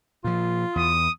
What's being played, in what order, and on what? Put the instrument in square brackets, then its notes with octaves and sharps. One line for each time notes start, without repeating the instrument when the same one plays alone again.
[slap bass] A#2 F3 [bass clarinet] F4
[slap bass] E2 [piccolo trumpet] D#6